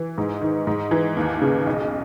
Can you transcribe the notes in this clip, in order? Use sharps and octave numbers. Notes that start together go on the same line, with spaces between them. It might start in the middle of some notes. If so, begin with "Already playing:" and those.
Already playing: E3
G#2
D#3
G#2
E3
D#2
C#3
B1